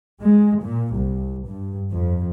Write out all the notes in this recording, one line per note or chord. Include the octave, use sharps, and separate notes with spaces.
G#3
A#2
C2
G2
F2